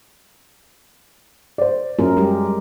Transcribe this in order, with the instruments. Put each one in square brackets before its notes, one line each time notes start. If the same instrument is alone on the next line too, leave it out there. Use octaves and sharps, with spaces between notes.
[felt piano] C5 D5
[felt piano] F#2 [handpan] A#4
[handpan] G3 G#3 G4